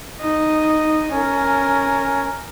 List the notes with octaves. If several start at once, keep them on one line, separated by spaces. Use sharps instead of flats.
D#4 D#5
C#4 A#4